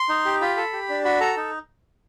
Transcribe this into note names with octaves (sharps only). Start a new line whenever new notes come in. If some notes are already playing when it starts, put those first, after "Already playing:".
Already playing: C6
D#4
G4
F4 B5
A4
G4
D4
F#4 B5
A4 A#5
D#4